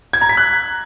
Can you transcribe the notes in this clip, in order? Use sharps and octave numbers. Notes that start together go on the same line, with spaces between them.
G#6
A#5
B6
F#6